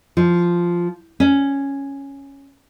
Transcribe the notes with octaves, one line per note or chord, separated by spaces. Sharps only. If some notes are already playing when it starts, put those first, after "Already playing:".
F3
C#4